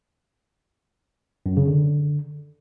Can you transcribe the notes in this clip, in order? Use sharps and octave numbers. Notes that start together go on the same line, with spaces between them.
F#2
C#3
D3